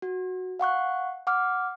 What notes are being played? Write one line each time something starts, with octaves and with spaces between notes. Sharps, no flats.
F#4
F5 F#5 C#6 F#6
F#5 D6 F6